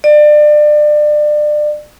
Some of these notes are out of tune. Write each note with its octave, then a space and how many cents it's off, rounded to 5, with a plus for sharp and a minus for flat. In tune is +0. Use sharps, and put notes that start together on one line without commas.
D5 +30